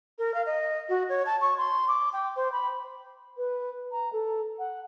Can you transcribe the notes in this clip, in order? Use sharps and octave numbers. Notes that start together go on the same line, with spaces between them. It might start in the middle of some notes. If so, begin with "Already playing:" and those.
A#4
F5
D#5
F#4
C#5
A5
C#6
C6
D6
G5
C5
B5
B4
A#5
A4
F#5